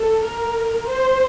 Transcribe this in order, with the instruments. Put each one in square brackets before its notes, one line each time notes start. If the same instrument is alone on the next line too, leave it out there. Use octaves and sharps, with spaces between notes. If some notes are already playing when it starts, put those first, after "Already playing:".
Already playing: [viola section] A4
A#4
C5